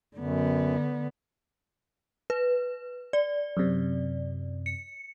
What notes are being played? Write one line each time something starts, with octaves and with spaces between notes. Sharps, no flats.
F#2 D3 B3
B4
D5
F#2 C3
C#7